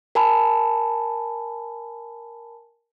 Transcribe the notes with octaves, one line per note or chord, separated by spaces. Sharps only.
A#4 G#5 A5 B5